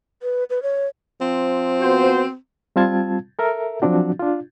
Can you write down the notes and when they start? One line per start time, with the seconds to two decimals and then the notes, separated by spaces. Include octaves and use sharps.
0.23 B4
0.50 B4
0.63 C#5
1.21 F3 C4
1.81 B3 F#4 C5
2.76 G3 C4 F4 A5 G#6
3.39 A4 A#4 E5
3.82 F3 F#3 C4 D4 F#4
4.20 D4 F4